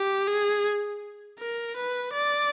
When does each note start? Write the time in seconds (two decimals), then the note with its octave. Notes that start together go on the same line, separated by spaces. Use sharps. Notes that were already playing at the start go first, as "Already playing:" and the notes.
Already playing: G4
0.28 G#4
1.39 A#4
1.77 B4
2.13 D5